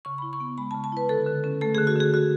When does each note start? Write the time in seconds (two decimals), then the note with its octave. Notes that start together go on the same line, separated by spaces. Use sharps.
0.05 C#3 C#6
0.18 E4 B5
0.33 C#6
0.40 B3
0.58 G#3 B5
0.71 C#3 A5
0.84 A5
0.92 E4 B4
1.09 D3 A4
1.26 D3
1.44 C#4
1.61 A3 A4
1.75 D3 G#4
1.87 F#4
1.96 D3 G#4
2.14 F#4